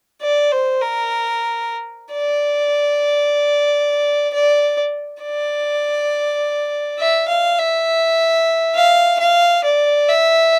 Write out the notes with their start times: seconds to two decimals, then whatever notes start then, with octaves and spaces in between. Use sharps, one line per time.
0.22 D5
0.52 C5
0.81 A#4
2.13 D5
4.33 D5
5.22 D5
6.99 E5
7.28 F5
7.58 E5
8.75 F5
9.20 F5
9.64 D5
10.09 E5